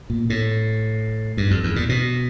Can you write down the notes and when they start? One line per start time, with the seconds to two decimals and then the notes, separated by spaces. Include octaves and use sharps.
0.10 A#2
0.30 A2
1.37 G2
1.51 F2
1.64 E2
1.76 A#2
1.89 B2